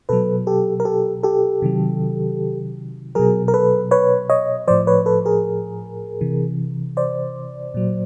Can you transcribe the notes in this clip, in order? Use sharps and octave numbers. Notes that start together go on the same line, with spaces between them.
B2 F#3 A4 B4
G4 A4
A#4
G4 A4
G4 A4
C3 D#3 F#3
B2 F#3 G#4 A#4
A#4
A4 B4
B4 C#5
C#5 D#5
A2 F3 C5 D5
B4 C#5
A4 B4
G#4 A#4
C3 E3
C5 D5
A#2 F#3